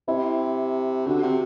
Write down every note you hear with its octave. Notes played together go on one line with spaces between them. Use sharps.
C3 E4
D3 F#4
C3